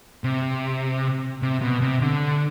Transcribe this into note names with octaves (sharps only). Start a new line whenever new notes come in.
C3
C3
B2
C3
D3